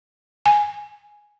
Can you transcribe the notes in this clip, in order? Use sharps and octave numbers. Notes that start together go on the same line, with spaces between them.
G#5